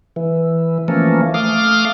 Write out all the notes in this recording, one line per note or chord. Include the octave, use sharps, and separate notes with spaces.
E3
E3 F3 A3 A#3 C#4
A3 F5 D6 D#6 F6